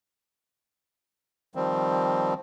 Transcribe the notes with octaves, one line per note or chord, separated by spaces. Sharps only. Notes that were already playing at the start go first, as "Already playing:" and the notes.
D#3 F3 G3 C4